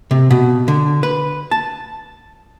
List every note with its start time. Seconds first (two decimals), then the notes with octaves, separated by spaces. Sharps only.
0.11 C3
0.31 B2
0.68 D3
1.03 B4
1.51 A5